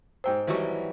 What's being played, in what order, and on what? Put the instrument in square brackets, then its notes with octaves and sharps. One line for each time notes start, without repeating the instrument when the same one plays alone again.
[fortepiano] G#2 G5 E6 [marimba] C5
[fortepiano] G#1 C#6 [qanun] E3 F#3 G3